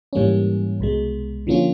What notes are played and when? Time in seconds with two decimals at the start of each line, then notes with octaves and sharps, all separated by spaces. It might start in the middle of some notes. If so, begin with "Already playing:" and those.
0.13 G#2 E3 G3 A#3 C#4
0.80 C2 B2 G#3
1.47 D3 F3 A#3 C#4 F4